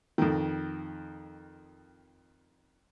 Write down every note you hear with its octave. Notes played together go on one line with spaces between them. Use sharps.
F2 D#3